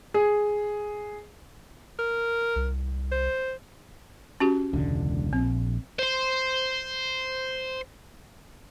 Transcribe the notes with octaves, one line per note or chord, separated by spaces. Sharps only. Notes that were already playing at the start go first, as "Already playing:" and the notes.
G#4
A#4
C2
C5
C#4 F#4 G4
E1 C#2 D3
A#1 C4
C5 C6